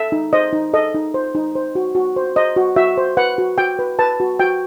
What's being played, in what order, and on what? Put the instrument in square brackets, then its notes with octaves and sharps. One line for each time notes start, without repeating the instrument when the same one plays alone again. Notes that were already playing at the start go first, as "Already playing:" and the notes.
Already playing: [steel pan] A4 E5
D#4
C5 D#5
D#4
A4 D#5
D#4
C5
D#4
C5
F#4
F#4
C5
C5 D#5
F#4
F#4 E5
C5
B4 F#5
F#4
F#4 G5
B4
B4 A5
F#4
F#4 G5